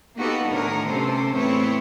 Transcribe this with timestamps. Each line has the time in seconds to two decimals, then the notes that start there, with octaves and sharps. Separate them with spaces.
0.17 A#3 B3 D#4 F#4 G4 A4
0.50 D2 A2 D3 D#3 A#4 C#5
0.87 C3 B3 C#4 A4 C5
1.32 E2 A2 B3 C4 E4 C#5